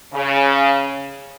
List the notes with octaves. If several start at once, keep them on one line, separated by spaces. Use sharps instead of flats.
C#3